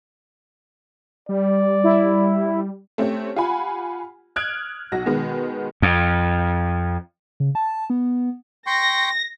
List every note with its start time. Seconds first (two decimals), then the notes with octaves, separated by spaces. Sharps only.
1.29 G3 D5
1.84 E4
2.98 A3 C4 C#4 G4
3.36 F4 G4 F#5 G#5 B5
4.36 D#6 F6 F#6 G#6 D7
4.92 B1 F#4 A#6
5.06 B2 D#3 G#3 B3
5.82 F2
7.40 C#3
7.55 A5
7.90 B3
8.67 G5 C6 C#6 A#6